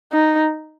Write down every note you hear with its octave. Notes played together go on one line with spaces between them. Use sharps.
D#4